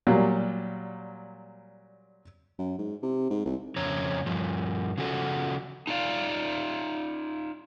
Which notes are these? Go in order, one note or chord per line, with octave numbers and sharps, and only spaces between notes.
A#2 F#3 G3
F#2
G#2
C3
G#2
C2
F2 C#3 C#5 A#5
G2 F3
C#3 F3 F#4 A4
D#4 F4 D5 F5